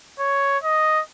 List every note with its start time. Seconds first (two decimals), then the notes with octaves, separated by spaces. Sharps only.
0.19 C#5
0.63 D#5